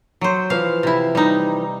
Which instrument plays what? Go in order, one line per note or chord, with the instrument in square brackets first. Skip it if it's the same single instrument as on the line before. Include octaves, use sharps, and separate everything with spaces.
[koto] F#3 C5
[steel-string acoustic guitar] E3 F3 [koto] F5
[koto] C3 E4
G3 D#4